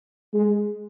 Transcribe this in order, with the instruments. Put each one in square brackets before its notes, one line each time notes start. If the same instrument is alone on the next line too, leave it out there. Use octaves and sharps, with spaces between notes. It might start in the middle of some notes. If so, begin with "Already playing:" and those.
[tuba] G#3